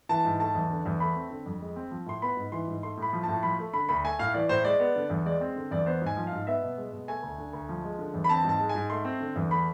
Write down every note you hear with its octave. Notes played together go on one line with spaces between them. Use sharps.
E3 A5
G#2
A3 A5
E2
D3
E2
A3 B5
C4
D3
F2
G#3
C4
F3
A2 C6
B3 B5
G#2
E3 C6
G#2
A3 C6
A2
B5
F3
A2 A5
F3 B5
A3
D3 B5
D2 B5
A3 G#5
A2 F5
E3 D5
A2 C5
G#3 D5
B3
D3
E2
G#3 D5
C4
D3
E2 D5
B3 C5
G#2 G#5
F3
F5
G#2
B3 E5
B2
G#3
B2
A3 G#5
D2
D3
D2
F3
G#3
D3
E2
B5
C4 A5
G#2 A5
G#3
G#5
G#2
A3 C6
C4
D3
E2
A3 B5